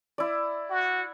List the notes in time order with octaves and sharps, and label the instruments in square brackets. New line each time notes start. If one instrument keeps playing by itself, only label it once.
[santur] E4 D5
[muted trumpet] F#4